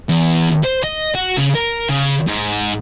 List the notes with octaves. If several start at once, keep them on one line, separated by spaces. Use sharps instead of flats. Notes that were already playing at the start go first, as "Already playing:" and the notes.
E2
C5
D#5
F#4
C#3
A#4
C#3
G#2